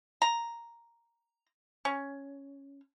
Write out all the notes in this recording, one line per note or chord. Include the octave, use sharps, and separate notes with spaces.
A#5
C#4